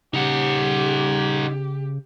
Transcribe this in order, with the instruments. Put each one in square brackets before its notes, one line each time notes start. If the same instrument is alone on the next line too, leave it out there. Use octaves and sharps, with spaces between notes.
[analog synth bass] C#3 [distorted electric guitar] D#4 F#5 [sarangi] G4